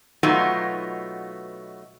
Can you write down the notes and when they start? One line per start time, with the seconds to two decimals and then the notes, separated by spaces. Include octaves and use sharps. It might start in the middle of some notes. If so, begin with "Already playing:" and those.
0.23 B2 F#3 A3 B3 D#4 F4